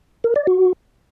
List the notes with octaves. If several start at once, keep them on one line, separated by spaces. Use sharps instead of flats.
A#4
D5
F#4